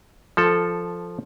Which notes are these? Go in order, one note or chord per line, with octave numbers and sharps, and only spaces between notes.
F3 A4